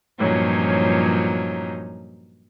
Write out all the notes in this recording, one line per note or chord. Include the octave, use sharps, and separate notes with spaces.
G2 A#2 F3 F#3 C#4 D#4